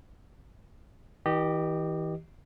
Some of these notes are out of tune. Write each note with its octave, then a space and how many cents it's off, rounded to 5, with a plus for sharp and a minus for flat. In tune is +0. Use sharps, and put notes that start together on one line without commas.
E3 -45 G4 -5 D#5 -30